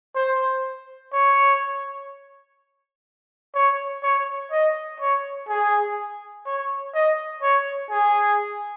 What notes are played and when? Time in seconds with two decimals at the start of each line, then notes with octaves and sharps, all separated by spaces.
0.15 C5
1.13 C#5
3.54 C#5
4.03 C#5
4.52 D#5
5.00 C#5
5.49 G#4
6.46 C#5
6.94 D#5
7.42 C#5
7.90 G#4